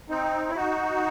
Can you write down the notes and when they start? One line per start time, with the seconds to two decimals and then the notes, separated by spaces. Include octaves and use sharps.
0.10 C4 D#4
0.49 E4
0.56 D#4 F#4